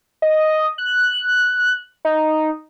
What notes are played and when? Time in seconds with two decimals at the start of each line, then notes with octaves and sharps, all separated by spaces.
0.22 D#5
0.78 F#6
2.05 D#4